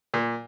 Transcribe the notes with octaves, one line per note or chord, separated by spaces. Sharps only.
A#2